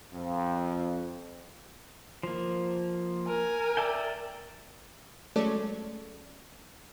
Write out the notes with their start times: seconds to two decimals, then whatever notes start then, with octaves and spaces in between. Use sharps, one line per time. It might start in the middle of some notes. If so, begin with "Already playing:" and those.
0.12 F2
2.23 F3 A#3
3.27 A#4 G#5
3.77 D5 E5 G5
5.36 F#3 G#3 A3 C#4 A4 D5